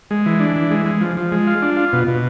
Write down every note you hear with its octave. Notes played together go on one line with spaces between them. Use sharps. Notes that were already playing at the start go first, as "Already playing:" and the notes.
G#3
E3
D4
E3
G#3
G#3
F3
F3
G#3
F4
D4
F4
B2
B2